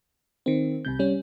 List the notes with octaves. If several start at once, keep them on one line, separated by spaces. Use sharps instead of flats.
D#3 C4
C2 C3 G6
G3 C#4